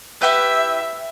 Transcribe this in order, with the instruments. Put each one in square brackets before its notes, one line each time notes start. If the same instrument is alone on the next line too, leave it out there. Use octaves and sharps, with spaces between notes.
[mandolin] E4 G4 B4 [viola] E5